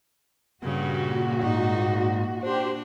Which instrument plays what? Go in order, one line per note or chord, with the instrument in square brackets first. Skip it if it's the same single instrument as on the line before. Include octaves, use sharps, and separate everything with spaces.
[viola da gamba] G2 C#3 [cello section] A#2 F#4
[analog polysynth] G#2 [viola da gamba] D#4
[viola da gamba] D4 [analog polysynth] G4 C5